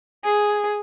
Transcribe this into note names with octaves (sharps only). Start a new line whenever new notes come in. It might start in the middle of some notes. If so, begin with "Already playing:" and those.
G#4